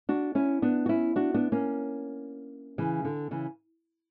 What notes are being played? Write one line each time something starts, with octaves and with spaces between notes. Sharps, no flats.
D4 F#4
C#4 E4
B3 D4
F#4
C#4 E4
D4 F#4
B3 D4
A#3 C#4
C#3 E3
D3
C#3 E3